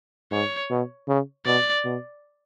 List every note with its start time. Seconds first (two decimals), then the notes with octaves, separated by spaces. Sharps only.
0.31 G#2 C#5
0.70 B2
1.08 C#3
1.46 B2 D5
1.85 B2